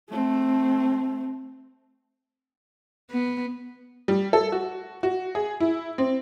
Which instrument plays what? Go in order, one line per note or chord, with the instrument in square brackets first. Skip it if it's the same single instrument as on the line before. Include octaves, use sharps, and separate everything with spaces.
[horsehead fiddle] A3 C4
[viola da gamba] B3
[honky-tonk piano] G3
A4
F#4
F#4
G#4
E4
C4